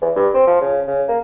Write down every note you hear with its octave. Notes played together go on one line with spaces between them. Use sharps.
E2
G2
C4
F3
C#3
C#3
A#3